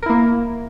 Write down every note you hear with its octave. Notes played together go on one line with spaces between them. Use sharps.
A#3 E4 A#4